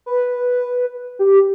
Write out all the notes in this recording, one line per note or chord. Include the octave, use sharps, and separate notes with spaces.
B4
G4